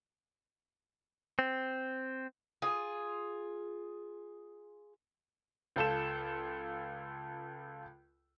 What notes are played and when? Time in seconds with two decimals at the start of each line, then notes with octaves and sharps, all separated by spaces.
1.39 C4
2.62 F4 G#4
5.76 C#2 F4 A4 G6 E7